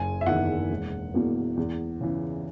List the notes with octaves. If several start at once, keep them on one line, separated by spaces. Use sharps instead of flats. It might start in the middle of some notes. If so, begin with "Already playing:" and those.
Already playing: F#1 G#5
E5
E2 D#3 F#5
E1
E2 B2 A#3
E2
C#3 E3